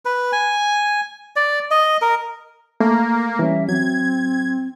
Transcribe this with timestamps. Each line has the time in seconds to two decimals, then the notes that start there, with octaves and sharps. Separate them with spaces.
0.05 B4
0.33 G#5
1.36 D5
1.71 D#5
2.02 A#4
2.80 A3 A#3
3.39 E3 G3 C#4 E5
3.69 F#3 C4 G#6